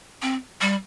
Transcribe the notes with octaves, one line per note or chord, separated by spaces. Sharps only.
C4
G3